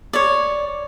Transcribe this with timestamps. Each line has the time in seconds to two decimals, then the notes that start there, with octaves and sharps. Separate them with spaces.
0.13 C#5 D5